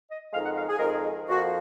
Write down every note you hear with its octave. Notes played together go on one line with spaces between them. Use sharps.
D#5
F2 D#3 G#3 D#4 F5
F#5
F5
G#4
F2 D#3 G#3 D#4 A#4
G#4
F2 F3 A#3 F#4